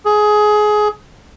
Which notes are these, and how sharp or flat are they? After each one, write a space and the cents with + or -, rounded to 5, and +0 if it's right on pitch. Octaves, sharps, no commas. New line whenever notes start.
G#4 +20